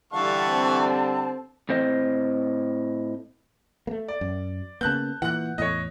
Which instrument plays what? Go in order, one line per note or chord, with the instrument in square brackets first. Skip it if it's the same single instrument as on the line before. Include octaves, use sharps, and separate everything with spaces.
[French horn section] D3 G3 [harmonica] E3 F#5 C#6 [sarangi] F5 [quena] A5
[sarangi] C4
[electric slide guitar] A2 C4 C5 D#5
[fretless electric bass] A3 A#3
[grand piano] D5
[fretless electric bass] F#2
[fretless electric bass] C#3 A#3 B3 [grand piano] A5 F#6 G6
[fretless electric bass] A#2 E3 [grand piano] F#5 F#6
[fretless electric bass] E2 A2 [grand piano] C#5 D#5